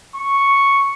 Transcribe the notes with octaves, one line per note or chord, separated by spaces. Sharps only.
C#6